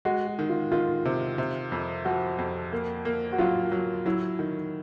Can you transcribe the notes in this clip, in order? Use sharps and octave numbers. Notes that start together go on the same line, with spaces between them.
G#3 F#4
F#4
D#3
F4
D#3 F4
C3
C3
F2
F3 F#4
F2
A#3
A#3
F#4
F#3 F4
F#3
F#3 E4
D#3